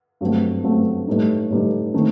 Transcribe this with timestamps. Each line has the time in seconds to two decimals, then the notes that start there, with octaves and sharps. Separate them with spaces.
0.21 G2 F#3 A3 C4
0.64 G2 F#3 A3 C4
1.08 A2 G3 D#4
1.51 A2 G3 D#4
1.94 D#3 A3 C4